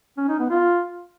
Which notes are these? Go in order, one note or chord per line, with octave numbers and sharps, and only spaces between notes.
C#4
D#4
B3
F4